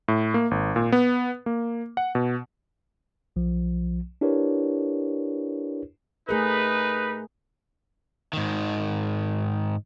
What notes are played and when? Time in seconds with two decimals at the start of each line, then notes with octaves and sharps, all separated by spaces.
0.08 A2
0.34 A#3
0.51 G#1
0.76 A#2
0.92 B3
1.46 A#3
1.97 F#5
2.15 B2
3.36 B1 F3
4.21 D4 E4 G4 A#4 B4 C#5
6.29 A3 D#4 G#4 A#4 B4
8.33 G#2 D#3